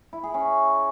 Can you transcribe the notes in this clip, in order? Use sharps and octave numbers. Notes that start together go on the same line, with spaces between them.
E4
G#4
C#4